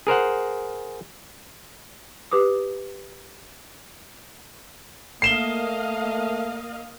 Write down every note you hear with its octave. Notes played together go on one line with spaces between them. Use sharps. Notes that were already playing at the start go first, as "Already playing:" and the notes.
G#4 A#4 C5 F#5
G4 B4 D6 D#6
A3 A#3 D#5 F5 C7 E7 G7